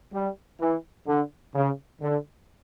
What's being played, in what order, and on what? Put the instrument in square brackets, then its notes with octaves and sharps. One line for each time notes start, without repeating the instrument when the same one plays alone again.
[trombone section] G3
E3
D3
C#3
D3